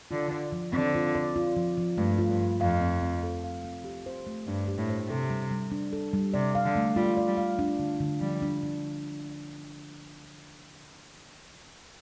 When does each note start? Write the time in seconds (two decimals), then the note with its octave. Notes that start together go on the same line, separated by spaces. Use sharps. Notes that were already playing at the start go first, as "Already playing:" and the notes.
0.11 D3 F4
0.32 D5
0.52 F3
0.73 D3 C4
0.95 F4
1.15 D5
1.36 F4
1.57 F3
1.77 F3
1.98 G2 A3
2.18 F4
2.30 G2
2.40 F3
2.61 F2 F5
2.81 C4
3.01 C4
3.23 A4
3.44 F5
3.65 C4
3.84 G4
4.06 C5
4.27 A3
4.47 G2 D4
4.68 G4
4.78 A2
4.89 C5
5.09 C3 A4
5.30 G3
5.51 G3
5.72 D4
5.93 A4
6.13 G3
6.34 C3 D5
6.55 F5
6.65 D3
6.76 A3
6.96 G3 F4
7.17 D5
7.27 G3
7.37 F5
7.59 D4
7.79 D3
8.00 D3
8.21 F3 G3
8.42 D4
8.63 D3